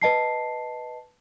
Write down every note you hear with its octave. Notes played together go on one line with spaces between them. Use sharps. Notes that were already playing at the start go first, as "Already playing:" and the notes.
B4 D#5 A5 C7